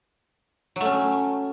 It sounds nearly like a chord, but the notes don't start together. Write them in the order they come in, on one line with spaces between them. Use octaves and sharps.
F#3 A3 C#4